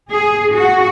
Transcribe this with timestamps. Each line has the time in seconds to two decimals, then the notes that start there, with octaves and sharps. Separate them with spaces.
0.10 G#4
0.54 F#4